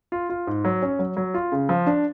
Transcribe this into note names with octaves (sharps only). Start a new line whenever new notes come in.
F4
F4
G#2
F#3
C#4
F#3
F#3
F4
C#3
F3
D4